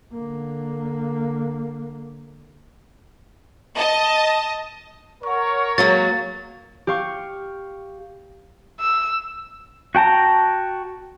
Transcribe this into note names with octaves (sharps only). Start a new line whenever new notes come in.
D3 A#3
D#5 A5
A#4 C#5 F#5 C#6
F#3 G#3 A#3 F5 A6
G4 F5 C#6
E6
F#4 G5 A5 A#5